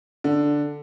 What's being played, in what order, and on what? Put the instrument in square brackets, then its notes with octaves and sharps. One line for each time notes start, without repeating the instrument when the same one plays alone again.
[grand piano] D3